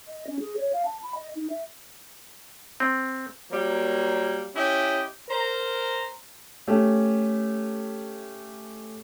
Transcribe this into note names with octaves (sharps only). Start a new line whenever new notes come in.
D#5
C#4
G#4
C#5
F5
A5
B5
D#5
D#4
E5
C4
F#3 G3 A#3
C#4 E4 G4 D#5
A#4 C5 A#5
A3 C#4 G4